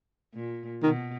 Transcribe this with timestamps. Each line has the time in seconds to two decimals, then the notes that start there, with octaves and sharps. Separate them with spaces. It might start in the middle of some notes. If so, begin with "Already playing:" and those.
0.34 A#2
0.83 B2 D#3